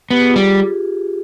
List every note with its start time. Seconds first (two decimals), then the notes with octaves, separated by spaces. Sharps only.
0.11 B3 G4
0.19 G#4
0.29 F4 G4
0.36 G3